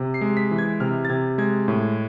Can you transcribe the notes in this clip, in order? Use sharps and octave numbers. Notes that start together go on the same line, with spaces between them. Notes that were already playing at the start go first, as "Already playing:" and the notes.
Already playing: C3
C7
G#3
B6
E3
G#6
C3 F6
A6
C3 G#6
G#3 G#6
A2